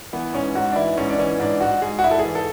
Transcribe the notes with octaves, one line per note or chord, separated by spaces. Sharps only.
E3 B3
G#2 C#4
G#2 F#4
D4
E3 E4
G#2 C#4
D4
E3 C#4
G#2 D4
G#2 F#4
G#2 G#4
F#4
G#2 E4
A4
G#4
E3
A4